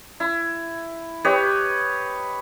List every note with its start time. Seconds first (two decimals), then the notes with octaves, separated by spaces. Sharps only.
0.20 E4
1.24 G4 B4 C#5 D#5